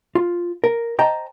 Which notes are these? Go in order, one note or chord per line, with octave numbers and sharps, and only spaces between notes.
F4
A#4
C5 D#5 G5 A5 A#5